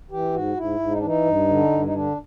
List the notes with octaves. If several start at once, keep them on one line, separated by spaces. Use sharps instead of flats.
E3 G4
G#2 F#4
G#2 E4
G#2
D#4
D4
E3 D#4
G2
D3
G2
D#4
D3 D4